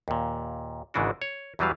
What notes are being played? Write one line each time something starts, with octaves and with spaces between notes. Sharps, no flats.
D#2 A#2
G#1 G#2 C#3 E3 D4 F#4
C#5
E2 E3 F#3 G3 B4 F5